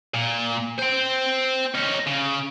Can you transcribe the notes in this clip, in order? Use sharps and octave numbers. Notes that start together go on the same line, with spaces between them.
A#2
C5 G5
C#4 D#4
C#3